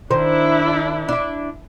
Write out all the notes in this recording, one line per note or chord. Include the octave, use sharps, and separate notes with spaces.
D#3 D4 E4 C5
D4 E4